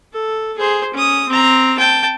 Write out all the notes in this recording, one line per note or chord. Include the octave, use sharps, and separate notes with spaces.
A4
G#4 C5
C#4 D#6
C4 A#5
G5 A5